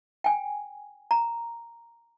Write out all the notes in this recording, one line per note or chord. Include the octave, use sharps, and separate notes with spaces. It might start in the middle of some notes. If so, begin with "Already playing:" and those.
G5 G#5
A#5